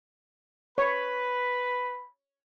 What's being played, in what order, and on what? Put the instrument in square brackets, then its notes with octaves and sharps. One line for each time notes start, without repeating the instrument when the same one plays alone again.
[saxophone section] B4 [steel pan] C#5 [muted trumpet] B5